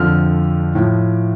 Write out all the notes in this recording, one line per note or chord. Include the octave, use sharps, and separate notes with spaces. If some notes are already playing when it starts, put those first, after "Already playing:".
Already playing: F2 D3 F3 F6
A2 F3